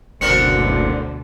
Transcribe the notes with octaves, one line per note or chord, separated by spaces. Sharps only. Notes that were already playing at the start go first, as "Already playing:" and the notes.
F#1 D2 B2 D3 C4 D4 A#4 C#7